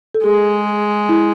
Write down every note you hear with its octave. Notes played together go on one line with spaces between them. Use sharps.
A4
G#3 G#4
E4